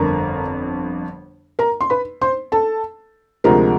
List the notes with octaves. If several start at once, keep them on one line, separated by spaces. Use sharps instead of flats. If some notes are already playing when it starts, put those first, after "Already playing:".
Already playing: G1 F2 D3 A#4 A#5
A#4 A#5
C6
B4 B5
C5 C6
A4 A5
D2 C3 F3 G#3 A#4 A#5